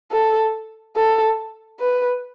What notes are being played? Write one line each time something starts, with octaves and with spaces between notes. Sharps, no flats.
A4
A4
B4